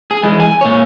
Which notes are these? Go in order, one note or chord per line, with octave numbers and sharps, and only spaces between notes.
G#4
E3 G#3
G#5
A#2 C#5